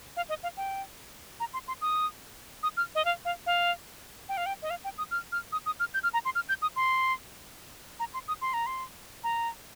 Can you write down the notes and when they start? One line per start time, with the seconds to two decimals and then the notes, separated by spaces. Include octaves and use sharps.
0.16 F5
0.29 D#5
0.43 F5
0.57 G5
1.40 A#5
1.53 C6
1.68 C6
1.81 D#6
2.63 D#6
2.77 F6
2.95 D#5
3.05 F5
3.25 F5
3.46 F5
4.29 G5
4.37 F5
4.46 G5
4.62 D#5
4.70 F5
4.84 G5
4.98 D#6
5.11 F6
5.32 F6
5.52 D#6
5.66 D#6
5.80 F6
5.94 G6
6.03 F6
6.14 A#5
6.25 C6
6.35 F6
6.49 G6
6.62 D#6
6.76 C6
7.99 A#5
8.14 C6
8.28 D#6
8.41 C6
8.54 A#5
8.66 C6
9.24 A#5